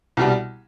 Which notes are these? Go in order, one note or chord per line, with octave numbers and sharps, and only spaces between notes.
C2 B2 G3